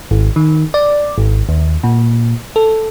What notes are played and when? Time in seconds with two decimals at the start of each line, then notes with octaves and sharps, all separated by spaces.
0.11 G#1
0.36 D#3
0.74 D5
1.18 G#1
1.49 D#2
1.83 A#2
2.56 A4